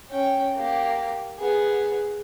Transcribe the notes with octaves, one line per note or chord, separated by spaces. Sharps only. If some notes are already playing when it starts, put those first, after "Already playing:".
C#4 G5
A#3 G4
B3 G#4